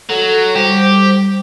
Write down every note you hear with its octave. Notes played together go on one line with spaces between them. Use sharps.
F#3 A4
G3 G4 C5